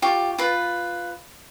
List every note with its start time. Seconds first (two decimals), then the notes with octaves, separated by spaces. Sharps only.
0.02 F4 G4 C#6
0.38 F4 B4